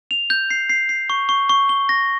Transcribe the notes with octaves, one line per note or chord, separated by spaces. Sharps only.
F7
G6
C7
C7
C7
C#6
C#6
C#6
G7
A#6